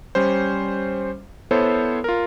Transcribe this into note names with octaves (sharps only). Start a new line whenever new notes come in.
G3 C#4 C5
B3 E4 A4 C5 C#5
F4 A#4